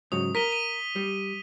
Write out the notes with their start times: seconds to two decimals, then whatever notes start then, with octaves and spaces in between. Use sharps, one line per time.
0.12 G#2 C#3 F#3 D#6
0.35 A#4 B6 D#7 G7
0.52 D#7
0.96 G3